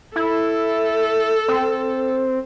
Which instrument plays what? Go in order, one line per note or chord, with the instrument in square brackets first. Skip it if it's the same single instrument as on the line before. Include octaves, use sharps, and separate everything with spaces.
[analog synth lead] E4 [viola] A4
[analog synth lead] C4